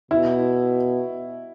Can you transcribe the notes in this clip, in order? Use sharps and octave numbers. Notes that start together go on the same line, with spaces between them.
B2 E4